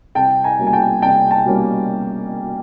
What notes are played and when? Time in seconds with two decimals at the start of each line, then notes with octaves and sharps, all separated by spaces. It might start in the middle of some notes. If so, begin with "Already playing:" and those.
0.15 C2 G5 A5
0.44 G#5 A#5
0.59 B2 G3 A#3 C#4
0.67 G#5
0.73 G5 A5
1.02 C2 G5 A5
1.31 G5 A5
1.45 B2 G3 A#3 C#4